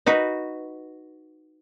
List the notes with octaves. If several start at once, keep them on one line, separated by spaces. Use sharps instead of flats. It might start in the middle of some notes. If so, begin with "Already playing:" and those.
D#4 F#4 B4